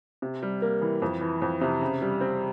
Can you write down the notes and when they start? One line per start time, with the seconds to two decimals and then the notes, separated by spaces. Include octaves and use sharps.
0.22 C3
0.42 G3
0.62 A#3
0.82 E3
1.02 F2
1.21 E3
1.42 F2
1.61 C3
1.81 C#3
2.02 G3
2.21 C4